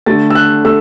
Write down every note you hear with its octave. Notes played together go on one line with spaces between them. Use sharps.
D3 A3 A6
E6
F#6
A3 E6